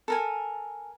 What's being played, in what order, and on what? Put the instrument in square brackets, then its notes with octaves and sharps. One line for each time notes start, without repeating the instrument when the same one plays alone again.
[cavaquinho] A4 A#4 G#5